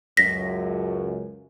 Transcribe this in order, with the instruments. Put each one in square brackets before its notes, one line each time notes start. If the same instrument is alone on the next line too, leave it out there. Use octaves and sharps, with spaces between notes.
[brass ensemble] C#2 F#2 [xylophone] A#6 B6